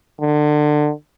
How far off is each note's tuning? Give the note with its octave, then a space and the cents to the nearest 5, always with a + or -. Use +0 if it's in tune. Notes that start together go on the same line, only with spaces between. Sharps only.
D3 +25